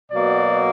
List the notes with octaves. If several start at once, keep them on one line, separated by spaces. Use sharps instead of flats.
B2 F#3 A#3 D5